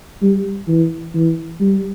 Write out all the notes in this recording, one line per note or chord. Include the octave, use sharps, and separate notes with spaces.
G3
E3
E3
G3